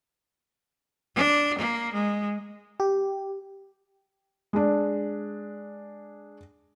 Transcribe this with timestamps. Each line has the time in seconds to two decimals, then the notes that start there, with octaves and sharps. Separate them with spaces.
1.16 D4
1.59 A#3
1.93 G#3
2.80 G4
4.53 G#3 D4